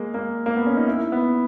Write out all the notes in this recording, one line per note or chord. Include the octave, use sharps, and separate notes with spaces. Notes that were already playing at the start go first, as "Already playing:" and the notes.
Already playing: G#3 A#3
A#3
A#3
B3
C#4
D#4
E4
B3